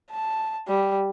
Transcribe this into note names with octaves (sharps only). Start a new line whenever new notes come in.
A5
G3